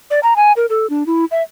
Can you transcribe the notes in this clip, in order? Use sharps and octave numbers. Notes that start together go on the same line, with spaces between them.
D5
A#5
G#5
A#4
A4
D4
E4
E5